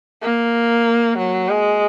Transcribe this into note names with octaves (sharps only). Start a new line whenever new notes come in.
A#3
F#3
G#3